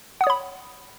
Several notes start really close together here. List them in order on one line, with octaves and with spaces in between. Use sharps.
F#5 D#6 C#5 B5